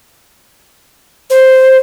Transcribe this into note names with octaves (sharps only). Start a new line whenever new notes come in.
C5